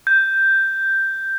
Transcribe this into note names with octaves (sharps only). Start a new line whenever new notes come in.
G6